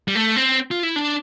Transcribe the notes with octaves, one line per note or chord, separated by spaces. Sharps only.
G3
A3
C4
F4
E4
D4